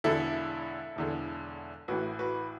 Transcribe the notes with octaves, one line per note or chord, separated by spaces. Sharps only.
E1 E2 D3 E4 A4
E1 E2 D3
A1 A2 E3 F#4 B4
F#4 B4